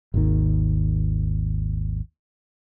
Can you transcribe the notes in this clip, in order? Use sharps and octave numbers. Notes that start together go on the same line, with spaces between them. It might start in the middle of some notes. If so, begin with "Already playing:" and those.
G#1 D#2 D#3